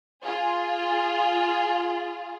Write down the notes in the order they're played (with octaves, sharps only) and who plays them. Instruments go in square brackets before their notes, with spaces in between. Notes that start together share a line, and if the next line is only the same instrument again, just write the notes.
[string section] F4 G#4